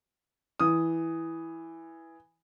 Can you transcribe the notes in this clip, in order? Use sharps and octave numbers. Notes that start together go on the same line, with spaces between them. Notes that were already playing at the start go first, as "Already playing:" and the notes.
E3 D#6